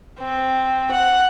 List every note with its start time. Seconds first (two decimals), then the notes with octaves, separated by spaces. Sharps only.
0.19 C4
0.91 F#5